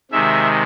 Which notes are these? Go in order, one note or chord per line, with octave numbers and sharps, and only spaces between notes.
C3 D#3 G#3 E5